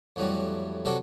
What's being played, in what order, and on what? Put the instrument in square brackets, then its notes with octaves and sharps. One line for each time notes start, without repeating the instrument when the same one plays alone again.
[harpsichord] F2 A2 E3 F#3 G3
C3 F#3 C4 D4 F#4 A4